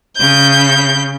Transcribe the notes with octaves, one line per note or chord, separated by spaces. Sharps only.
C#3 G6